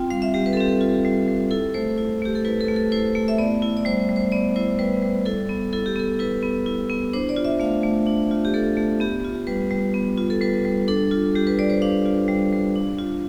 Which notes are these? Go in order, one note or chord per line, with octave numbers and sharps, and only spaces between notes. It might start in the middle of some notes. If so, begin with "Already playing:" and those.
Already playing: C4 F4 G5
G3 F5
E5
G3 G4
B4
A4
C4 G4
A4
F4
G3
G3
E4 A4
A3 C5
E4
A3 G4
A4
E4 B4
A4
A3
A4
E4 C5
A3
E5
B3 D5
E4
D5
G3 C5
G3
C5
B3 D5
E4 C5
G3 B4
G3
E4 A4
B3
E4 A4
G4
B3 A4
E4 B4
B3
E4
B3
D4 C5
D5
F4
E5
A3 F5
A3
D4
F4
G4
A3 A4
A3
B3 G4
F4
G3 B4
G3
B3
F4
A4
G3 B4
G3
D4 A4
F4
G3 G4
B4
G3 D5
C5
D4 F5
F4
G3
G3
D4
F4